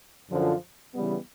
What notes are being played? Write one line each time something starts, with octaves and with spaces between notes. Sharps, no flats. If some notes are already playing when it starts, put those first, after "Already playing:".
F#2 D3 F3
C#3 E3 G3 B3